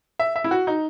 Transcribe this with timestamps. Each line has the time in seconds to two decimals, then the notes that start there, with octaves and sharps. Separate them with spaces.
0.19 E5
0.36 E5
0.44 E4
0.51 F#4
0.67 D#4